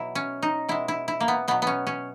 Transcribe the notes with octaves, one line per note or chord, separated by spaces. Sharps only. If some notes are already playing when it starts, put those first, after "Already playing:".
Already playing: B2 F#3 E4
C#4
D#4
B2 G#3 E4
E4
E4
A#3
B3
B2 F#3 B3
B3 C#4
C#4